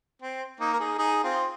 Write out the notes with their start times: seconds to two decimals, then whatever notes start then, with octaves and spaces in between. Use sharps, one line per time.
0.22 C4
0.60 A#3 D#4
0.73 A#4
0.79 D#4 G#4
0.98 D#4 G#4
1.24 C4 F4